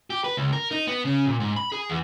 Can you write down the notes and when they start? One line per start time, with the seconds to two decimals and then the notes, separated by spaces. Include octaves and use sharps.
0.10 G4
0.24 B4
0.37 C#2
0.53 A#4
0.71 D#4
0.87 B3
1.05 C#3
1.26 A#2
1.40 G#2
1.56 B5
1.72 G#4
1.90 E2